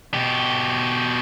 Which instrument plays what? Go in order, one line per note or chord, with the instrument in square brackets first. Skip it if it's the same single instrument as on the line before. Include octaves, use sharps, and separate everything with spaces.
[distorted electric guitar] B2 G4